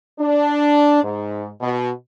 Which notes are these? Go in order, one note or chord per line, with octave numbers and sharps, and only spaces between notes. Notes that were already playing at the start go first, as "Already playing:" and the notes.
D4
G#2
B2